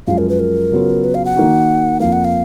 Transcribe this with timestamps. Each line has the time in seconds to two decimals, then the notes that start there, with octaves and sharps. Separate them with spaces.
0.07 F#2 F3 G#3 F5
0.18 A#4
0.29 B4
0.39 A#4
0.72 C#3 F#3 B3 F4
1.04 B4
1.15 F5
1.25 F#5
1.36 D#3 A#3 D#4 F#4
2.00 F2 F3 A#3 F5
2.13 F#5
2.25 F5